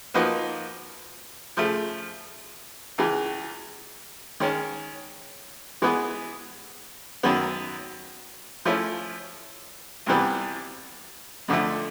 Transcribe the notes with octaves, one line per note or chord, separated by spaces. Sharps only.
F3 A#3 D#4 F#4 B4
C#3 F3 A3
C#2 C#3 E3
D#3 G#3 C#4
E3 G#3 B3
F#2 D#3 F#3 B3
F3 A3 C#4 E4
C2 C3 E3 G3 B3
F2 D3 F3 A3